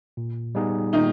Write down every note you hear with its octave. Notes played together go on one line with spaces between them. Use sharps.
A#2
G3 B3 D#4 G#4
A#2 D#3 D#4